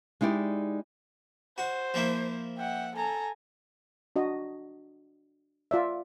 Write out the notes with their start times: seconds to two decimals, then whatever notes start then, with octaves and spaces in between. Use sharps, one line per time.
0.21 G#3 D#4 E4 G4 D5
1.58 F#4 C5
1.94 F3 A#3 E4
2.58 E5 F#5 G5
2.95 A4 G#5 A#5
4.16 D4 F#4 D#5
5.71 F4 D5 E5